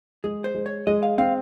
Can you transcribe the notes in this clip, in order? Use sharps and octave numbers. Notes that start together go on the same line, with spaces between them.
G#3 G#4
C5
G#3
C#5
G#3 D#5
F5
C4 F5